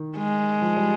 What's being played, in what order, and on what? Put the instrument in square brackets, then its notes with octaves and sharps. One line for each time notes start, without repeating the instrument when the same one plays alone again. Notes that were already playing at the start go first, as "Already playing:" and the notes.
Already playing: [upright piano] D#3
[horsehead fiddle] G#3
[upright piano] F3
G3